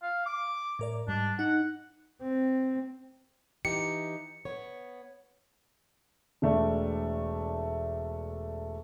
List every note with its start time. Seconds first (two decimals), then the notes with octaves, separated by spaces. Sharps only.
0.02 F5
0.26 D6
0.79 A2 A#4 D5
1.08 G#2 G3 D4
1.39 D#4 F#5
2.22 C4
3.65 E3 D#4 G4 C#7
4.45 B3 C#5
6.42 E1 A3 D5